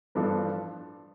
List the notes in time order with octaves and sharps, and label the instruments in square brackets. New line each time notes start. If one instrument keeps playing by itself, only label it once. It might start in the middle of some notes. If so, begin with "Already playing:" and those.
[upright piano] A1 G2 F3 D4 A4